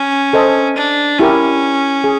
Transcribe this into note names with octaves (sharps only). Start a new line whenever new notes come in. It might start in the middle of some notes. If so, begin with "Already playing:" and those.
Already playing: C#4
A4 C5 D#5
D4
C#4 E4 G4 A#4
G#4